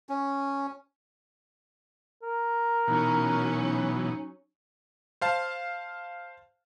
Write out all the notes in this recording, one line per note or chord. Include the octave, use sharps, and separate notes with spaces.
C#4
A#4
B2 E3 F#3 C#4 D#4
C5 F5 A5